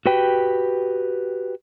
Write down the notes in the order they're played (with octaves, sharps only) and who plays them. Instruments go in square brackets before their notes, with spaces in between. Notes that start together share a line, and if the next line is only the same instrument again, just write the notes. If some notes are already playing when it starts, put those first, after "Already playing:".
[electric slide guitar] F#4 G4 B4 G5